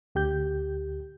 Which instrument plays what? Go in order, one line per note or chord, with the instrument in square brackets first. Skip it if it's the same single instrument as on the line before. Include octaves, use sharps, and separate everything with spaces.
[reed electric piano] D2 G4 G6